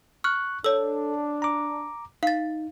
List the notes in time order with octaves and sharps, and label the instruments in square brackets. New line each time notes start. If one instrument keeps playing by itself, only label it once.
[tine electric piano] C#6 F#6 [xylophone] F6
[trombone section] D4 [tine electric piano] A4 [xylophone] C#5 E6
[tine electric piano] A#5 D6
[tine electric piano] D#4 [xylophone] F5 A6